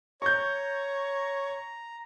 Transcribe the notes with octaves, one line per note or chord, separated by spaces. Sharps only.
C#5 A#5 C#6 G6